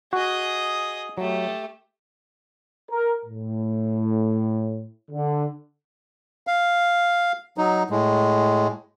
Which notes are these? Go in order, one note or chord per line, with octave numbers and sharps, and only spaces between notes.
F#4 G#4 D#5
F#3 A3 G4
A#4
A2
D3
F5
F#3 D#4
A2 G#3